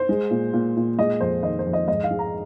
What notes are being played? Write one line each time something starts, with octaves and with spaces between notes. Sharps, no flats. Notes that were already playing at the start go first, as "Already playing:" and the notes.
Already playing: C5
G#3
A#2
A#2
A#2
G#3 D#5
F2 C5
D#3 D#5
C5
F2
D#5
G#2 D#5
F5
G#3
A#5